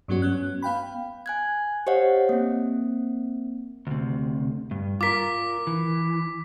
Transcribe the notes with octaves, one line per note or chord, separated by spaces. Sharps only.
G2 F#3 B3 C#4 F#4
B3 C#4 F#6
B3 F5 G5 B5
G#5 F#6 G#6
G4 C5 C#5 D#5 F5 F#5
A#3 C4
D2 C3
G2
F4 A#4 D6 B6
E3